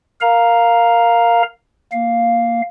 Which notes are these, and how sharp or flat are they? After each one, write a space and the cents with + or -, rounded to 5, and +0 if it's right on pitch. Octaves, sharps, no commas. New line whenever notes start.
A#4 +0 F5 +5 A#5 +0
A#3 +0 F5 +0